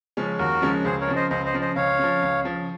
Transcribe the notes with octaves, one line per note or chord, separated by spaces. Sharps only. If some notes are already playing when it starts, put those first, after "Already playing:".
C#3 F3 G#3 C#4
D#2 F#4 A#4
C#3 F3 G#3 C#4
C#2 G#4 C5
A#4 C#5
C#3 F3
C5 D#5
C#2 C5 D#5
C5 D#5
C#3 F3
C5 D#5
C#2 C#5 F5
C#3 F3
C#2
C#3 F3